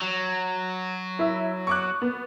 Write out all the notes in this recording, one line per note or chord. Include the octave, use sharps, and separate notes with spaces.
F#3
E4 E5
C#6 D6 F#6
B3